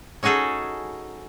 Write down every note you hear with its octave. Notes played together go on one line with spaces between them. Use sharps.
C#4 D#4 F#4 G#4 A4